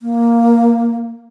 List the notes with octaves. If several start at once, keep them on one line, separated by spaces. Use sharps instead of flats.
A#3